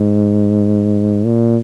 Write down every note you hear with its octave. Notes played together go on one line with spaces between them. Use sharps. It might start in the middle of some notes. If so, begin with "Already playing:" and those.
Already playing: G#2
A#2